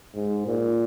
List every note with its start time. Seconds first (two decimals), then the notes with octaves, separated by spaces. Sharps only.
0.15 G#2
0.47 A#2